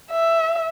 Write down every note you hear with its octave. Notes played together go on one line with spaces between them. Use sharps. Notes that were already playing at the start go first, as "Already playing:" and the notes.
E5